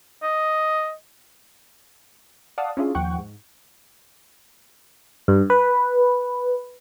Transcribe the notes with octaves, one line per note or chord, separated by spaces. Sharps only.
D#5
D5 F5 F#5 A5 D#6
C#4 D4 E4 F4 G#4
D#2 F3 F#5 G5 C#6
G#2
G2
B4